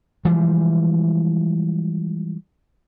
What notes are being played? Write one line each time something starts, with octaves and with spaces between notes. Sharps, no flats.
E3 F3 G3 G#3